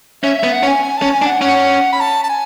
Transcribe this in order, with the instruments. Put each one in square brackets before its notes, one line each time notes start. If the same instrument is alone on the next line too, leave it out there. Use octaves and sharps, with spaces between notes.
[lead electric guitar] C#4 [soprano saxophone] E5
[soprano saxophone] E5
[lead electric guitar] B3
[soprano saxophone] F#5
[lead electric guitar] C#4
[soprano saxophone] G#5
G#5
[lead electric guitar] C#4 [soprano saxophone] A5
[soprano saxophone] G#5
[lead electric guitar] D4
[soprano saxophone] F#5
[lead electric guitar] C#4 [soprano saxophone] F#5
[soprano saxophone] B5
A5
A5
G#5